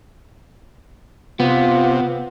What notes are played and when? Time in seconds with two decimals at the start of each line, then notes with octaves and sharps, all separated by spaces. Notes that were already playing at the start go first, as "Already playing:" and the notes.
1.40 C3 B3 F4